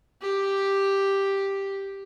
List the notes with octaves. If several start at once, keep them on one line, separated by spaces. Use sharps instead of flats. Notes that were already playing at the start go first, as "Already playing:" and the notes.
G4